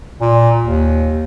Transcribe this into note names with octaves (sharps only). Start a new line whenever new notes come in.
A#2
D#2